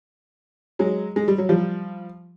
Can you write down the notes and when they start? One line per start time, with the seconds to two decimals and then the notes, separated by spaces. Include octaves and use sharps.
0.79 F#3 G#3
1.16 G#3
1.28 G3
1.38 F#3
1.49 F3 G3